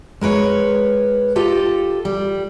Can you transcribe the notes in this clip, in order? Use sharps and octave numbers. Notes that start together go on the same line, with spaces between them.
G#3 A#4 B4 C#5
F4 G4 A4 D#5
G3